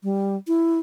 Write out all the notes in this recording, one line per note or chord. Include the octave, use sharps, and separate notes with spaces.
G3
E4